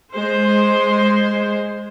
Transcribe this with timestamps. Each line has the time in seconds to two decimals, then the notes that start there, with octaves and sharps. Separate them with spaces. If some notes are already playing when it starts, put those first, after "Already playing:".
0.12 G#3 C5